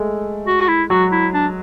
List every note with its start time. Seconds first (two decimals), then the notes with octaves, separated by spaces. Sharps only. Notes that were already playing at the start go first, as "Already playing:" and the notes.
Already playing: G#3 A3
0.47 F#4
0.61 F#4
0.68 E4
0.90 F#3 F#4
1.12 E4
1.34 D4